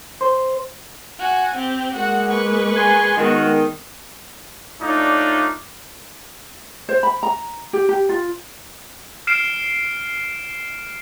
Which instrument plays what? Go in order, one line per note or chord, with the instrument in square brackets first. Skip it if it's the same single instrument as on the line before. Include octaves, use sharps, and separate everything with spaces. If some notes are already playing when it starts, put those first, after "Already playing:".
[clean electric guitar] C5
[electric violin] F#4 G#5
C4 G4
[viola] G#3 A#3 [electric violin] F#4 F#5
[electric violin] B4 C#6
[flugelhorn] G#4 [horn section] G#5 C6
[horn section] D#3 [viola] G#3 B3 [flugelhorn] F#4
[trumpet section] A3 D4 D#4 F4 C#5 D5
[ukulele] C5
B5
A#5
G4
G4
F4
[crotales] F6 C7 D7 E7